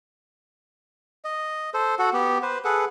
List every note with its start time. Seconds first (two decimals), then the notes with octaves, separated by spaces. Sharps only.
1.25 D#5
1.74 A4 C5
1.99 F#4 A4 F#5
2.13 B3 G4
2.42 B4 C5
2.65 G#4 A4 B4 F#5